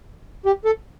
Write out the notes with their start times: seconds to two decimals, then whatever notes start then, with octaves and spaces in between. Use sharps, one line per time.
0.46 G4
0.65 A4